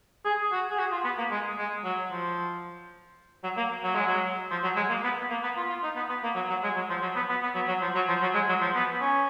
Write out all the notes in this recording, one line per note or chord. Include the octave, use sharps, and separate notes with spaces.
G#4
F#4
G#4
F#4
F4
B3
A#3
G#3
G#3
F#3
F3
F#3
A#3
F#3
G#3
F#3
F3
F#3
G#3
A#3
B3
A#3
B3
F4
F4
D#4
B3
B3
A#3
F#3
F#3
G#3
F#3
F3
F#3
B3
B3
B3
F#3
F#3
F3
F#3
F3
F#3
G#3
F#3
F3
B3
C#4